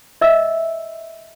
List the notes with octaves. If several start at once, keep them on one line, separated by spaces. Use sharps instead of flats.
D#5 E5 E6